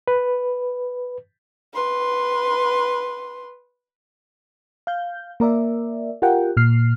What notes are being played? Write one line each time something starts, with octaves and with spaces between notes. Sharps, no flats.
B4
B4 C6
F5 G6
A#3 A#4 D5 E5
F4 G4 A#4 F#5 G5
A#2 F6 C7